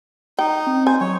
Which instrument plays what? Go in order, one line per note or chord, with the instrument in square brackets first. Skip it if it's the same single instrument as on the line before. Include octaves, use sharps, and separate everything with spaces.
[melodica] D#4 [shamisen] G5
[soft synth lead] C4
[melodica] C5 [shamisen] G#5
[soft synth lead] F#3 [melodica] C#5